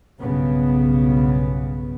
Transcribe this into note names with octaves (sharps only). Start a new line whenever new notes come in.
B1 G2 C#3 B3